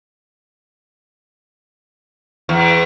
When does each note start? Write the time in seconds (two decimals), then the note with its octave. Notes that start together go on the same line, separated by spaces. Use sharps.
2.49 E2